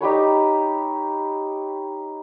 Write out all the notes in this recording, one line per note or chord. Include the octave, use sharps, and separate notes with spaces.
D#4 G4 B4 C#5